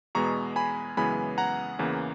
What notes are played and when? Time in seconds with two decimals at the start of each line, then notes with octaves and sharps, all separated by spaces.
0.15 E2 B2 G#3 B3 A#5 C#6
0.56 G#5 B5
0.97 F#2 C#3 E3 G#3 B3 G#5 B5
1.38 F#5 A#5
1.79 E2 C#3 E3 A#3